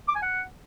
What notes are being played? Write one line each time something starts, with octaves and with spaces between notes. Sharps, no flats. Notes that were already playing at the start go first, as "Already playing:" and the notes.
D6
G#5
F#5